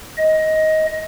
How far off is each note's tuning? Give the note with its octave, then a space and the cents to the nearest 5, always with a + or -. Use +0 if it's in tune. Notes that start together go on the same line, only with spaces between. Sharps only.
D#5 +15